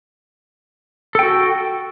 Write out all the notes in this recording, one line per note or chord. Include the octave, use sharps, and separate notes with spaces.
F#4 A4 G5